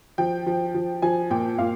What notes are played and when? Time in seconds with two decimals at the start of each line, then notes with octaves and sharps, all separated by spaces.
0.18 F3 G5
0.46 F3
0.75 F3
1.02 F3 G#5
1.30 A#2 G5
1.58 A#2 F5